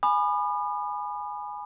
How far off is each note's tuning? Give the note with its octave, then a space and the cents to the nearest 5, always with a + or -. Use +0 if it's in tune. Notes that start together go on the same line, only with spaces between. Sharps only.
G#5 +0 B5 +0 D#6 -45